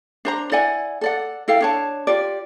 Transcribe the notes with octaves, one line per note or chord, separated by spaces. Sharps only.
D4 C5 A#5
E4 D5 F#5 G#5
A4 D5 F#5
E4 A4 F5 G5
D4 C#5 A5
F4 G4 D5